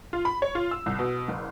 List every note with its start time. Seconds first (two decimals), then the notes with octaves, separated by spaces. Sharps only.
0.13 F4
0.25 B5
0.42 C#5
0.55 F4
0.71 E6
0.86 C2
0.99 B2
1.28 F#1